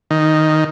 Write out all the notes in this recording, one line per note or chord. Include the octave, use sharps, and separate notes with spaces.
D#3